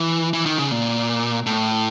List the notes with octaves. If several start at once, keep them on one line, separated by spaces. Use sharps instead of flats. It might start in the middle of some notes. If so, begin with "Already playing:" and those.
Already playing: E3
E3
D#3
C#3
A#2
A2